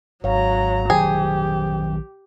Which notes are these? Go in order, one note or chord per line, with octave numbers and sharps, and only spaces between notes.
G#1 F#3 C#5 F5 A#5
A#1 D#3 F#3 G4 G#4 C5 G5